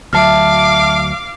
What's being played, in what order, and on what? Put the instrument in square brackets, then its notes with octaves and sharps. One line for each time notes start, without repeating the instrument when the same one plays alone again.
[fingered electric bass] D2 F#3 [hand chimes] E5 A5 F6 [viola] F5 D6